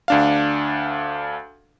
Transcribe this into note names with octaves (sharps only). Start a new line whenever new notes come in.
D2 D4 F5